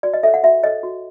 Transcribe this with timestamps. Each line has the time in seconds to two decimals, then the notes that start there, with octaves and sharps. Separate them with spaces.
0.03 F#4 D5
0.14 D#5
0.23 A4 C#5 E5
0.34 F#5
0.43 F#4 E5
0.63 A4 C#5 D#5
0.83 F#4